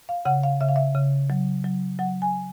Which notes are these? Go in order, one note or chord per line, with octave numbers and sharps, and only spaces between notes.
F5
C#3 F#5
F5
C#3 E5
F5
E5
C#3
F#3
F#3
F#3 F#5
G#5